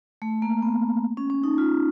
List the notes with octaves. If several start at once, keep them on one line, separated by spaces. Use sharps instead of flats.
A3
A#3
B3
C#4
C#4
D#4
F4